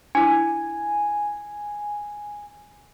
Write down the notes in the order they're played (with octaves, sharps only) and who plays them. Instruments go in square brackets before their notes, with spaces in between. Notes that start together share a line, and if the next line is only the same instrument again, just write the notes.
[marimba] D4 E4 [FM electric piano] G#5